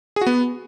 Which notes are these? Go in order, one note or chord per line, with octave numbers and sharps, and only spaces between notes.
G#4
F#4
B3